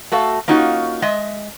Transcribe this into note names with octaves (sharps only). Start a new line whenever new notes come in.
A3 F#4 A4 F5
A#3 C#4 D#4 F4 F#4
G#3 D#5 E5